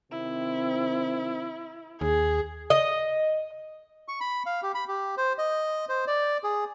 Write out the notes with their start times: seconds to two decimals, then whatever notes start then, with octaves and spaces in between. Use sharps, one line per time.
0.11 C3 D#3 C4 E4
2.01 D#2 G#4
2.70 D#5
4.08 C#6
4.20 B5
4.46 F5
4.63 G4
4.75 B5
4.88 G4
5.17 C5
5.38 D#5
5.89 C5
6.07 D5
6.44 G#4